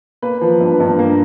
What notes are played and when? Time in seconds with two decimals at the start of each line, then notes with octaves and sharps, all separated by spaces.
0.22 A#3 B4
0.41 F3
0.60 G2
0.80 G2
0.99 A#3